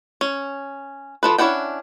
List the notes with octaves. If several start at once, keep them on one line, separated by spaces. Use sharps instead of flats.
C#4
F3 A4 B4
C#4 D4 E4 F#5 G5